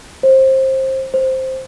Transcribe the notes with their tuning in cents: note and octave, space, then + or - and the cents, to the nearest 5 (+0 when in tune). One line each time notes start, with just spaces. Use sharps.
C5 +20
C5 +0